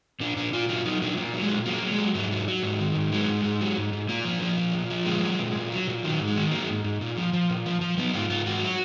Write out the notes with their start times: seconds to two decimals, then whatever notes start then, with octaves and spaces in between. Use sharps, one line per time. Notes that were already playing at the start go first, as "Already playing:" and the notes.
0.20 A#2 D4
0.36 A#2 D4
0.53 A#2 F4
0.69 F#3 F4
0.85 F#3 D#4
1.02 A#2 D4
1.17 A#2 A#3
1.34 F#3
1.41 G#3
1.50 A#2
1.66 F#3 A#3
1.82 F#3
1.91 G#3
1.98 F#3
2.15 G#2 F#3
2.31 F#3
2.48 F#3
2.63 G#2
2.79 D#3
2.95 G#2
3.12 F#3 G#3
3.29 G#2
3.44 G#2
3.61 F#3
3.77 G#2
3.93 G#2
4.09 A#2 A#3
4.25 F3
4.42 F3
4.57 A#2
4.74 A#2
4.90 F3
5.06 A#2 G#3
5.22 F#3
5.39 A#2
5.55 A#2
5.72 F#3
5.87 A#2
6.03 D#3 F#3
6.20 G#2
6.27 G#3
6.36 D#3
6.51 F#3 A#3
6.69 G#2
6.84 G#2
7.01 A#2
7.17 F3
7.33 F3
7.50 A#2
7.66 F3
7.81 F3
7.98 F#3 B3
8.13 G#2 F4
8.30 G#2 F4
8.46 G#2 F#4
8.62 F#3